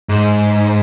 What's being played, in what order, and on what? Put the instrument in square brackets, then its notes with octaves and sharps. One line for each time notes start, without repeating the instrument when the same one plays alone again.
[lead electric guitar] G#2